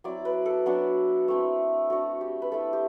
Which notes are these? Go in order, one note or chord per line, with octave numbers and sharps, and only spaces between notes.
F#3 C4 E4 D5
B4
A4
F#3 B3 D4
A3 C4 E4
A3 D4 F#4
G4
B4
A3 C4 E4 A4
G4